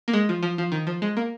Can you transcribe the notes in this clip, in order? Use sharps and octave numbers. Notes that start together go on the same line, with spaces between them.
A#3
G#3
F3
F3
F3
D#3
F3
G#3
A#3